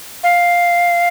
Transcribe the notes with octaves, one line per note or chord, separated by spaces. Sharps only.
F5